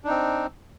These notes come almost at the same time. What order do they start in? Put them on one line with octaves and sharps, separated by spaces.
D4 D#4 C4